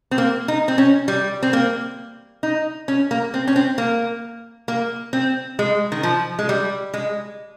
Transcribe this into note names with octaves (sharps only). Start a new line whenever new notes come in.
C4
A#3
D#4
C4
C#4
G3
C4
A#3
D#4
C#4
A#3
C4
C#4
C4
A#3
A#3
C4
G#3
D#3
F3
G#3
G3
G#3